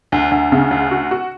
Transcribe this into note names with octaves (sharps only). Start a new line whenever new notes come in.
D2
D2
C#3
D2
F#4
F#4